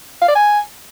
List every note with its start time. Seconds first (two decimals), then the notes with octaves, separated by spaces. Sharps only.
0.22 F5
0.28 D5
0.35 G#5